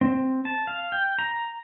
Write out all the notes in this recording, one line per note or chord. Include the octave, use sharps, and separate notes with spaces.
C4
A5
F5
G5
A#5